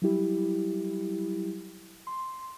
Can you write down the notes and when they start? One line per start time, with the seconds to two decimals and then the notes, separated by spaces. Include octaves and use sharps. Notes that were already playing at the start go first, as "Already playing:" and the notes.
0.02 F#3 G3 E4 G4
2.07 C6